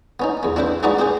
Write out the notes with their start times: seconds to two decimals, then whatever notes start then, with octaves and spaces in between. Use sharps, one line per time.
0.20 B3 C#4 D#4
0.43 E2 B3
0.56 C4 D4 E4 B4 C5
0.83 G#3 D#4 F#4 B4 D5 F#5
0.99 C4 G4 G#4 C5